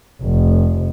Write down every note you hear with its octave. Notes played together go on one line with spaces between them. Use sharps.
F1